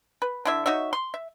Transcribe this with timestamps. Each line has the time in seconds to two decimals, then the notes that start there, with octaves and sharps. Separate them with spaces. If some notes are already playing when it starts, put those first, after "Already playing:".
0.22 B4
0.45 D3 E4 E5
0.66 D#4 F#4 C#5 E5
0.93 C6
1.14 E5